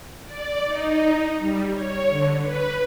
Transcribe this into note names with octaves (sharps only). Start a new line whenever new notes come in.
D5
D#4
G3
C#5
D3
B4